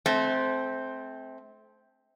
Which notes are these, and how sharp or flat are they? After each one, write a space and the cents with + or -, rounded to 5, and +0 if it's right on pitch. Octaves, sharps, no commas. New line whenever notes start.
A3 -30 C4 +0